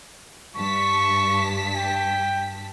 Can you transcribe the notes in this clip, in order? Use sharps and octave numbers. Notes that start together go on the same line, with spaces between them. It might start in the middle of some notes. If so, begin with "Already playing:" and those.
G2 A5 C#6 B6
G5